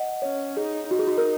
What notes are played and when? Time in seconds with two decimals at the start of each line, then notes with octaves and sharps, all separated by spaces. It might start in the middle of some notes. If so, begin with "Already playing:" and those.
Already playing: D#5 F#5
0.22 C#4 C#5
0.57 D#4 G#4
0.90 D#4 F#4
0.99 G#4
1.07 F#4
1.18 A#4